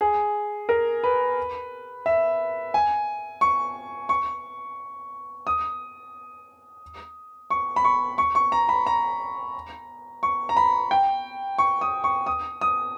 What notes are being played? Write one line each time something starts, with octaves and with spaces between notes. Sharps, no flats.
G#4
A#4
B4
E5
G#5
C#6
C#6
D#6
C#6
B5
C#6
C#6
C#6
A#5
B5
A#5
C#6
A#5
B5
G5
C#6
D#6
C#6
D#6
D#6